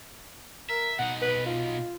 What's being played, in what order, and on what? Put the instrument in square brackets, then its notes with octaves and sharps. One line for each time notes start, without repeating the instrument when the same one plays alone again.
[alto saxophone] A#4 [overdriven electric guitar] E5
[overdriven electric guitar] B2 D#4 [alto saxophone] F#5
[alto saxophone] B4
F4